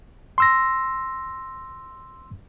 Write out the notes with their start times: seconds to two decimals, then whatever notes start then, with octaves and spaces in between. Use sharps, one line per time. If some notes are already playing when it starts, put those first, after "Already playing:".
0.38 C6 E6 A#6